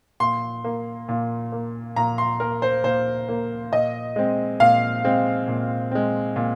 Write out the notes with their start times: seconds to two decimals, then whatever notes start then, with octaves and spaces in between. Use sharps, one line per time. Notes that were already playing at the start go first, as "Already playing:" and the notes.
0.20 A#2 C6
0.64 A#3
1.08 A#2
1.52 A#3
1.96 A#2 A#5
2.18 C6
2.40 A#3 A#4
2.62 C5
2.84 A#2 C5
3.29 A#3
3.72 A#2 D#5
4.16 G#3 C4
4.60 A#2 F5
5.04 G#3 C4
5.48 A#2
5.91 G#3 C4
6.36 A#2